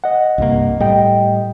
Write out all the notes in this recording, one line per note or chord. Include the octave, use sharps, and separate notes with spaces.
D#5 F#5
C2 G2 A#3
A2 G3 D#5 G5